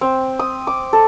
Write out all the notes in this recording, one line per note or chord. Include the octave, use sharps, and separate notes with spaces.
C4
D#6
D6
A4